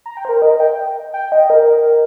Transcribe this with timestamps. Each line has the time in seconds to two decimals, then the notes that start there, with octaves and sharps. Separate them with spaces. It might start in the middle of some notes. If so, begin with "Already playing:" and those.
0.06 A#5
0.17 G5
0.25 C5
0.29 A#4
0.42 D#5
0.60 G5
1.14 G5
1.32 D#5
1.50 A#4